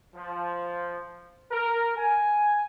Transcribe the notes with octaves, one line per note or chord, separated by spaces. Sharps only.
F3
A#4
G#5